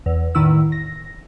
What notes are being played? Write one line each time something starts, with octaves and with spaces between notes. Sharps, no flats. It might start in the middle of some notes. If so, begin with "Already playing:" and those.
E2
E2 A2 D#3 E4 E6
A#6